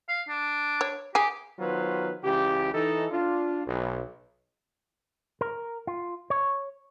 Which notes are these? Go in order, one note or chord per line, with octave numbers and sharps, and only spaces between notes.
F5
D4
C#5
G4 G#4 G#5
D#3 F#3 B3 F4 B4 C5
C#2 C#3 E3 G4
E3 D#4 A4
D4 F4
B1
A#4
F4
C#5